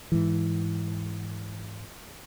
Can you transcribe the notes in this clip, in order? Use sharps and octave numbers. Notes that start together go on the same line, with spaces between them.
G#2 E3